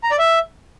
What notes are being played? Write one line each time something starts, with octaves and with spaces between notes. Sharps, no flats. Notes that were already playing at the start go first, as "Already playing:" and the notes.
A#5
D5
E5